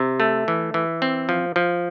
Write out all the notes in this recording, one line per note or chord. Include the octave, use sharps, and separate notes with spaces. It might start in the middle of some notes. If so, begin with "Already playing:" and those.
Already playing: C3
A3
E3
E3
C4
F3
F3